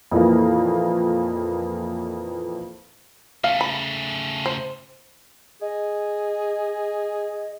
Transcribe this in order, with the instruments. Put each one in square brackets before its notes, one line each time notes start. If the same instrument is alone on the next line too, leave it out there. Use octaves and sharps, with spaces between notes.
[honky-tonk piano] F2 A#2 E3 A#3
[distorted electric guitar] C#3 A3 [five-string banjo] F5
[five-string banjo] B5
C5
[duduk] G#4 [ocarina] D#5